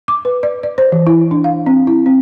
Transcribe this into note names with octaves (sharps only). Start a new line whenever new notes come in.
D6
B4
D5
D5
C5
E3
E4
D4
F5
C4
E4
C4